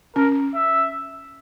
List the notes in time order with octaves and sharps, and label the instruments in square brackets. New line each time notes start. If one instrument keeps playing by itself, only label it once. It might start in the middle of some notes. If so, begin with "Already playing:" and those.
[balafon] C#4 [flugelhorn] A#4
[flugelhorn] E5